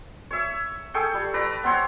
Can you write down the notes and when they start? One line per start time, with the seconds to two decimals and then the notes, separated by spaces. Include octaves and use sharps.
0.31 C#5 E5
0.94 G#4 A4 G5 C#6
1.14 G3
1.34 B4 D5 A#5
1.63 B3 C4 C5 C#5